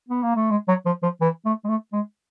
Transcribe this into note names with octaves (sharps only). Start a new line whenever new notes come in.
B3
A#3
A3
G#3
F#3
F3
F3
E3
A3
G#3
A3
G#3